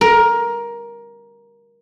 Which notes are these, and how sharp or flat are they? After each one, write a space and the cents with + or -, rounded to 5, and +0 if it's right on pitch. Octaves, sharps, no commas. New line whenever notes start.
A#4 +15